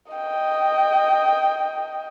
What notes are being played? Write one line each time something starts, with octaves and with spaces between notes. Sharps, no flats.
D#5 G5